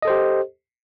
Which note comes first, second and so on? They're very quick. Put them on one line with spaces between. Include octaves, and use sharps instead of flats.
D#5 A4 C5 G4